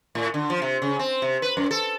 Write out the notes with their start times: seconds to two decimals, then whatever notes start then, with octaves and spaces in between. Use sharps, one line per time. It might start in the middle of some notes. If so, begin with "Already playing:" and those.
0.15 A2
0.34 D3
0.50 F3
0.62 C3
0.82 C#3
0.99 C4
1.22 C3
1.42 B4
1.57 F#2
1.71 A4